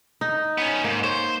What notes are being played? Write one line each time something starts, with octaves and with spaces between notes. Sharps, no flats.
D#4
B3 C#4
G#2 A#3
C5 C#5